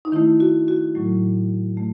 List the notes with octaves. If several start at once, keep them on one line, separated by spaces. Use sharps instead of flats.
D#4
D#3 A3 E4
F#4
F#4
A2 F#3 A3
A3